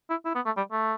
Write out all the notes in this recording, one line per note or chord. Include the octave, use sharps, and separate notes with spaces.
E4
E4
B3
A3
G3
A3